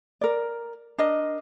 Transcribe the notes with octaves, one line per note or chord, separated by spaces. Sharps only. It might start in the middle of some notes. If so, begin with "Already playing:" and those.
A#4 D5
D4 A#4 D#5